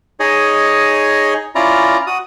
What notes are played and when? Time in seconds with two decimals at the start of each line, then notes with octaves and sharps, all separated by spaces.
0.20 D#4 G#4 C#5 D#5
1.55 C#4 E4 F4 D5 A#5
2.07 F#4 D#6